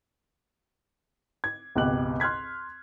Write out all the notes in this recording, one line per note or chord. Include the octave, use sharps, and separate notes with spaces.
G#6
G#1 C#2 B2 G4 F#6 F#7
C6 F6 F#6 G#6 B6